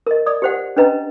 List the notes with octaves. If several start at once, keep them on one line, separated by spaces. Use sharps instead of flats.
A#4 D#5
D5 D#6
G4 C5 F#5
C#4 D4 B4 D#5 A#5